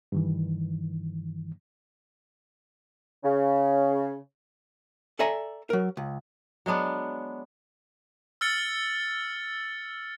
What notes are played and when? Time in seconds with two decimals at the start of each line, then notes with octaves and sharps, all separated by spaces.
0.12 G2 D#3 E3
3.23 C#3
5.19 A4 D5 E5 G#5 A#5
5.70 F#3 A#4
5.97 C#2
6.66 F#3 G#3 B3 D4
8.41 E6 F6 A6 C#7